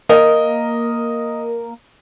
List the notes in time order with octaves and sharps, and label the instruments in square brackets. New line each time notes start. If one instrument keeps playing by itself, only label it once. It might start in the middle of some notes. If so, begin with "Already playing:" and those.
[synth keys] A#3 A#4 [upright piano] D#5